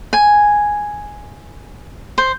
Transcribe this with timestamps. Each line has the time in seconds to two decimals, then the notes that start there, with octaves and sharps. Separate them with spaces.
0.13 G#5
2.18 C5